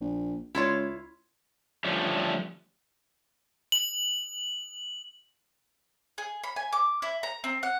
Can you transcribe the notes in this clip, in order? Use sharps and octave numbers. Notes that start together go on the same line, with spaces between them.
A#1
C#2 E4 F4 C#5
D3 F3 G3 A3 C#4
F#7
G#4
B5
G#5
D6
E4
A#5
C4
F#5